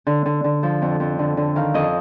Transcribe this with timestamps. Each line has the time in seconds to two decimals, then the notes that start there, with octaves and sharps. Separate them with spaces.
0.07 D3
0.26 D3
0.44 D3
0.63 F3
0.82 F2
1.00 F2
1.19 D3
1.37 D3
1.56 D#3 F5
1.74 F2 D#5